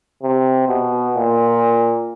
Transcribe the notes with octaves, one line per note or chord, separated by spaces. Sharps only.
C3
B2
A#2